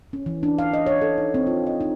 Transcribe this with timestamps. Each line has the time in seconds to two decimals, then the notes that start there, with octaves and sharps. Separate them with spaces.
0.13 C#4
0.26 E3
0.43 D4
0.58 F5
0.73 D#5
0.86 C#5
1.01 A4
1.18 D#4
1.34 C4
1.47 F4
1.67 D#5
1.81 D#4